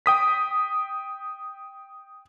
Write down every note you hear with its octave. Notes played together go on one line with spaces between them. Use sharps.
G5 D#6 B6